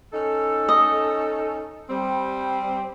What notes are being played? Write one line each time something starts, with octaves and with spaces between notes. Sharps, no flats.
C#4 D#4 A4
D#5
G3 C4